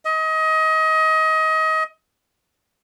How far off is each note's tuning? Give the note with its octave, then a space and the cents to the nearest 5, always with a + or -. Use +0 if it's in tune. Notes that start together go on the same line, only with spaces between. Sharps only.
D#5 +25